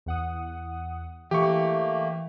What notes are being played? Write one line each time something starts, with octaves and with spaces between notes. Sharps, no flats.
E2 F#5 D#6
E3 A3 A#3 G4 C#6